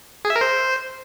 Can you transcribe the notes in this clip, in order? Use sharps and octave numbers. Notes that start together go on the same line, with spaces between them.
G#4
E5
A#4
C5